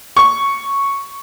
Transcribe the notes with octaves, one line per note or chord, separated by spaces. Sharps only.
C#6